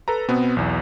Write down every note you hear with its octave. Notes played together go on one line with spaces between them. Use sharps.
A4 B4 A#5
B2 B3 C4
B1 E2